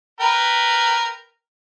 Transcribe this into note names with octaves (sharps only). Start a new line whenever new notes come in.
A#4 B4 G5